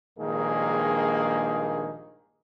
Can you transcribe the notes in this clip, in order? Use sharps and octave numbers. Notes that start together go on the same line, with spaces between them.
A#1 G2 D#3 G#3 A#3 G#4